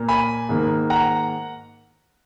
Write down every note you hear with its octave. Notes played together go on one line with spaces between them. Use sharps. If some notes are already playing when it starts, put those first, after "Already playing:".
Already playing: A#2 A#3
G#5 B5
G#2 D#3 A#3
F#5 A#5